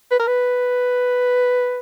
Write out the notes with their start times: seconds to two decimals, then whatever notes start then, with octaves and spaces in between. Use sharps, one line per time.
0.11 B4
0.20 A#4
0.27 B4